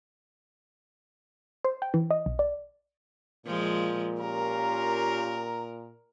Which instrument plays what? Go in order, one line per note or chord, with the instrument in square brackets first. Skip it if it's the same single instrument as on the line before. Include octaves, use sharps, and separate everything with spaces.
[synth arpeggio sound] C5
G5
E3
D#5
B1
D5
[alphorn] A#2 [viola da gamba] F3 G#3
[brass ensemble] C#4 F4 G4 [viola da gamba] A#4 [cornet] A#5